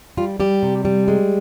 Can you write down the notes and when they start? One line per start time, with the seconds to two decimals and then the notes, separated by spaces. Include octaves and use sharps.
0.17 G3 F4
0.40 G3 G4
0.63 C3
0.85 G3
1.08 G#3